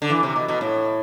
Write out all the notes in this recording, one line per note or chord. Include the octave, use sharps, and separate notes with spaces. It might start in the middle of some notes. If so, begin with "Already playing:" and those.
D3
E3
C3
B2
B2
A2